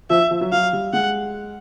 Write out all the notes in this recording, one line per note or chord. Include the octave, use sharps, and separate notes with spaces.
F3 E5
F3
F#3
F#3 F5
G3
G#3 F#5